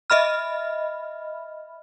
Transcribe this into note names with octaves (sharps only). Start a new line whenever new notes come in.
D#5 E5 B5 F6